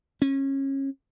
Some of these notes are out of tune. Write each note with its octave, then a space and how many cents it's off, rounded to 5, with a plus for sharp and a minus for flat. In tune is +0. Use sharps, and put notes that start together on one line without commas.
C#4 -25